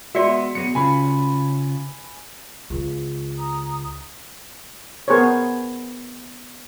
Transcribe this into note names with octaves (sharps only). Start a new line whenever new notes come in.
G#3 B3 F#4 D5 E5 C6 C#7
F#3 B3 G#4 C#7
C#3 C#4 F4 G#5 B5
C#2
A#5 D#6
B3 G#4 A#4 C5 C#5